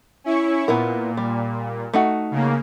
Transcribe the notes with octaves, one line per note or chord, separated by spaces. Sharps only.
C#4 E4 C#6
A#2 B3 E4 A#4
G3
A3 D#4 F#4
C#3 A#3